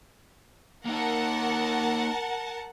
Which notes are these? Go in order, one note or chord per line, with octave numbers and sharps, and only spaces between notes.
A#3 D#4 A#4 F#5 A5